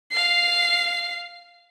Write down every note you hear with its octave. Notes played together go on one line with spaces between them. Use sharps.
F5 C7